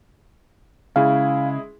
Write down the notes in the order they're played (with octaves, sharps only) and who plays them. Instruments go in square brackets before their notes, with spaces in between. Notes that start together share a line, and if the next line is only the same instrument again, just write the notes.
[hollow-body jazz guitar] C#3 [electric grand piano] G#3 E4 G#4 [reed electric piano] F5